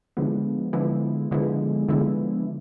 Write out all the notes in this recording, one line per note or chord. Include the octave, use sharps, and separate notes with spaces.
D3 F3 G#3 B3 E4
D3 F3 G#3 B3 E4
D3 F3 G#3 B3 E4
D3 F3 G#3 B3 E4